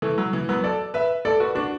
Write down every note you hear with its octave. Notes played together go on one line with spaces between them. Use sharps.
E3 A3
F#3
E3
F#3 B3
A4 D5
B4 E5
A4 D5
F#4 B4
D4 F#4